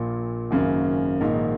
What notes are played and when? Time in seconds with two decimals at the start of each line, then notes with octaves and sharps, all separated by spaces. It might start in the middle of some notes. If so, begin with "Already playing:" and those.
Already playing: A#1 A#2 A#3
0.51 G#1 F#2 C#3 A#3
1.21 A#1 G#2 D#3 A#3 D#4